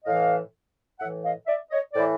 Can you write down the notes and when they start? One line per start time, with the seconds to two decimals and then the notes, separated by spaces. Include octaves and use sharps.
0.05 A2 E3 D#5 F5
0.99 A2 E5 F#5
1.04 E3
1.23 D#5 F5
1.47 D5 E5
1.71 C#5 D#5
1.94 A2 E3 C5 D5